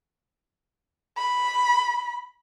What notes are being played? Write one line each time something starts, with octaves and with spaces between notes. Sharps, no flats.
B5